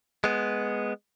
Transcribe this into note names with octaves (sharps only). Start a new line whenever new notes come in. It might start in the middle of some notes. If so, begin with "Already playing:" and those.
G#3 B3